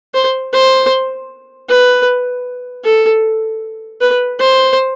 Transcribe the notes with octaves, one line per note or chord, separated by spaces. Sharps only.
C5
C5
B4
A4
B4
C5